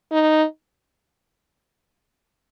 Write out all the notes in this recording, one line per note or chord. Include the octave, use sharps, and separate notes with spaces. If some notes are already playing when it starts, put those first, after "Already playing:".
D#4